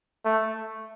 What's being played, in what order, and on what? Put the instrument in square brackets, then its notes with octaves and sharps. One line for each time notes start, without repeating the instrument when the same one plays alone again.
[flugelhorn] A3